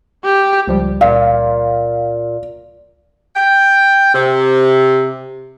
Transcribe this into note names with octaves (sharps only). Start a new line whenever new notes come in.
G4
C#2 F3 G3
A#2 F5
G5
C3